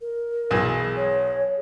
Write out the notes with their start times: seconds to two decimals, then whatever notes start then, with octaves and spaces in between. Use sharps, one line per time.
0.01 A#4
0.51 B1 E3 G#4
0.97 C#5